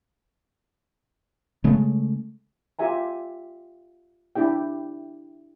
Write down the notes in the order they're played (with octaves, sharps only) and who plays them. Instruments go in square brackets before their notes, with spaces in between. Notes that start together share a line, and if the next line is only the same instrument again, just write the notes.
[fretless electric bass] C#3 G#3 A3
[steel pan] F4 G4 E5 G#5 A#5
D4 E4 G4 G5